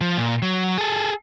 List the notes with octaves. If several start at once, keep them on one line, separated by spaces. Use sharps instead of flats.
F3
A#2
F#3
G#4 A4